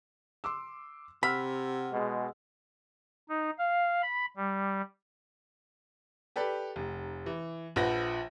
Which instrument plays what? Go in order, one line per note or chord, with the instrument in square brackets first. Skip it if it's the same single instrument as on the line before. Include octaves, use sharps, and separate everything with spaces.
[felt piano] C6 D6 E6
[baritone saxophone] C3 [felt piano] F#5 E6 F6 [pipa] B5
[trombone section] B2 G#3
[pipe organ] D#4
F5
B5
G3
[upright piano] G4 A4 B4 D5
F1
E3
A#1 F3 B4 F#5 A#6